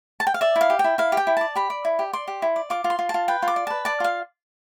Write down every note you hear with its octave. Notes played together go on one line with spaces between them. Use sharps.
A5
G5
F5
D5 E5
E4
F5
G4
G5
E4
E4 F5
G4
G5
E4
D5 A5
G4 B5
D5
E4
G4
D5 C6
G4
E4
D5
F4 D6
F4
C6
F4
F4 A5
B4 G5
F4
D6
D5
B4 A5
D5 A5
F4 F5